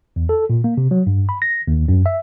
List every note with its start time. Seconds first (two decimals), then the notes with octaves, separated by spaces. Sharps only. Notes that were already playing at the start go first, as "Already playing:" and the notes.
0.16 E2
0.29 A4
0.50 A#2
0.64 A#3
0.77 C3
0.91 F#3
1.07 G2
1.29 B5
1.42 A#6
1.68 D#2
1.88 F#2
2.06 E5